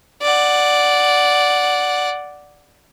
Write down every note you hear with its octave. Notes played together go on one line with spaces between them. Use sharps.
D5 F#5